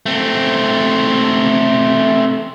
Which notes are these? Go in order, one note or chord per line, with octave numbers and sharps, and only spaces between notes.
A3 C4